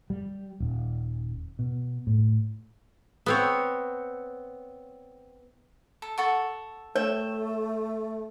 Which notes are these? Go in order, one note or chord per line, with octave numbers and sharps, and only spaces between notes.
G3
D#1
B2
A2
B3 C4 C#5
A4
A4 F#5 C#6
A3 C#5 E5 G5